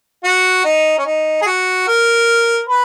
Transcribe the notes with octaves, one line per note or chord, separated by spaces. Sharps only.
F#4
D#4
C#4
D#4
G#4
F#4
A#4
B4